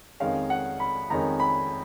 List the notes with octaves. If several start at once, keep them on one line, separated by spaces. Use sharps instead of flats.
F2 D#3 G#3 C#4 F5
F#5
B5
F2 D#3 G#3 C#4 A#5
B5